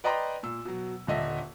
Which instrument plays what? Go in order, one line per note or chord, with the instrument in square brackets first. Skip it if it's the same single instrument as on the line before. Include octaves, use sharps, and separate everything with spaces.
[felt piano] B4 D5 D#5 G5 A#5 C6
A#2 E6
B2 F#3
D#1 D3 D#5 E5